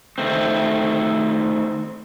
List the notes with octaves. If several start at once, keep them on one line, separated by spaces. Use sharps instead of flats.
D#3 A3 C4